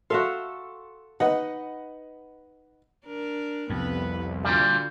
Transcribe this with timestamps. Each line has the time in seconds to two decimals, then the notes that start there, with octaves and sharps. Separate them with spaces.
0.10 F#4 A4 E5 F5 C6
1.20 D#4 B4 D#5 F#5
3.06 D4 A#4
3.70 C2 F2 B3 B4
4.44 A#2 D3 G3 F4 F#4